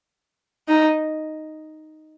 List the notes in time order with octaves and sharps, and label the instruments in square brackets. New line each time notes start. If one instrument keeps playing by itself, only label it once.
[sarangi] D#4